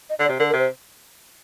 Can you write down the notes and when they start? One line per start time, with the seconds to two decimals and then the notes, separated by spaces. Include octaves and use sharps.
0.10 D#5
0.20 D3
0.24 D5
0.29 C3
0.39 D3 A#4
0.49 A#4
0.53 C3
0.59 C5